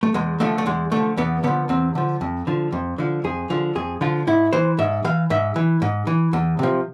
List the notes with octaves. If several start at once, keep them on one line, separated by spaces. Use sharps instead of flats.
A3
E2 G#3
D3 F3 A3
A3
E2 G#3
D3 F3 A3
E2 B3
D3 F3 B3
E2 C4
D3 F3
F2
D3 F3
F2
D3 F3
F2 G#4
D3 F3
F2 G#4
D3 F3 F4
G#2 E4
E3 C5
G#2 E5
E3 F5
G#2 E5
E3
G#2
E3
E2
C3 F3